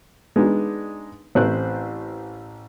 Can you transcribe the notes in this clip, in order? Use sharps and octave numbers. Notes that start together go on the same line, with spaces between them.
G#3 B3 D4 D#4
A1 A3 C4 B4 C5 F#6